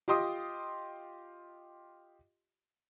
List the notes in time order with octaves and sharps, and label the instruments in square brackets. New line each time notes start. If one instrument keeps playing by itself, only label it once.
[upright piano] F4 G4 D#5 C6 D#6